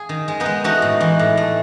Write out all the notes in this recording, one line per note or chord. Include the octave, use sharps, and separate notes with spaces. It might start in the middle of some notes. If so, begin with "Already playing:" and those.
Already playing: G#4
D#3
G#3
B3 D#4
G#3
A3 D#4 F#4
A2
E3
A2
A3